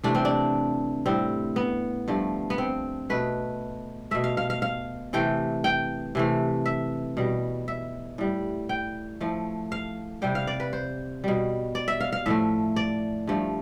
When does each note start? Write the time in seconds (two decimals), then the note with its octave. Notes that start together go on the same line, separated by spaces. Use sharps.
0.03 C3 E3 A3 D4
0.15 C4
0.25 D4
1.06 A2 G3 C4
1.56 B3
2.08 G2 F3 A3
2.50 B3
2.58 C4
3.10 B2 A3 B4
4.11 B2 A3 E5
4.24 F5
4.37 F5
4.50 F5
4.62 F5
5.13 C3 E3 A3 G5
5.64 G5
6.15 C3 E3 A3
6.66 E5
7.17 B2 G3
7.68 E5
8.18 A2 G3
8.69 G5
9.21 A2 F3 A3
9.72 F5
10.22 C3 G3 G5
10.35 F5
10.47 D5
10.60 B4
10.73 C5
11.24 B2 G3
11.75 D5
11.88 E5
12.01 F5
12.12 F5
12.26 A2 F3 A3 E5
12.76 D5
13.27 G2 F3 A3